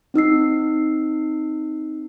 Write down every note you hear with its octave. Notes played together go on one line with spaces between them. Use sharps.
C4 D#4 E6 C7